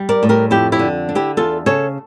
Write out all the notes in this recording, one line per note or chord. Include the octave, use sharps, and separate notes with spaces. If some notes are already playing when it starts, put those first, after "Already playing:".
Already playing: G3
A#4 D5
A2
G4 A#4
F2 E4 G4
E4 G4
D3
D4
E4 G4
E2 F4 A4
C#3 A4 C#5